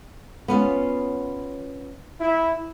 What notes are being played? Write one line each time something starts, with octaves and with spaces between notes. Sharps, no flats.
B3 C#4 F4
E4